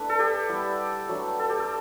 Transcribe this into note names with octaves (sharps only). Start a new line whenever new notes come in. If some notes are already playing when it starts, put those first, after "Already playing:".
Already playing: A3 B3 D4 E4 B4
A4
G4
G3 B3 E4
F#3 A3 D4
A4
G4
A4